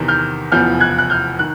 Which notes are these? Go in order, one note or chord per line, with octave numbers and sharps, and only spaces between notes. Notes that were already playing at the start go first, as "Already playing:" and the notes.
Already playing: E2 C3 D#3
F6 G6
F1 E2 C#3 F3 F6 G6
F#6 G#6
F#6
F6 G6
D#3 F#6